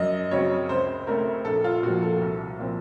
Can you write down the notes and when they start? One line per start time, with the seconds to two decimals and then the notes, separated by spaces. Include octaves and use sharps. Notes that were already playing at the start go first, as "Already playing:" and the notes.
Already playing: F#2 D#5
0.31 C#3 F#3 C4 C#5
0.69 C#2 C5
1.07 C#3 A3 C4 A#4
1.45 A#1 A4
1.64 F4
1.83 A#2 F3 F#4
2.02 A4
2.21 C2
2.59 A#2 F3 C4